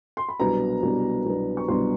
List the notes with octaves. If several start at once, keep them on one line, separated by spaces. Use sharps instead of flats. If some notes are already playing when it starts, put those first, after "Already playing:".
C6
B5
C2 B2 F#3 B3 D4 A#5
C2 B2 F#3 B3 D4
C2 B2 F#3 B3 D4
C#6
C2 B2 F#3 B3 D4 C6